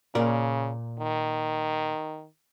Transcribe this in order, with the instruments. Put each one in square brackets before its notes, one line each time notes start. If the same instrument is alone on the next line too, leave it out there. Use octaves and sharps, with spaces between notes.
[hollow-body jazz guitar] A#2 A#4 D5 [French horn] C#3
[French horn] D#3